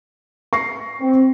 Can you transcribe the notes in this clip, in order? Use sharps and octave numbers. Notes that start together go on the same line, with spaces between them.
C#6 A#6 C7
C4